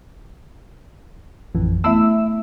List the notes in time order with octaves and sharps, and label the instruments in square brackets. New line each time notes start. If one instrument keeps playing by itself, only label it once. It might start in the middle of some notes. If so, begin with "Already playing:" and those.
[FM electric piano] A1 F2 E3
[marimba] A3 B3 E4 [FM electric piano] E5 E6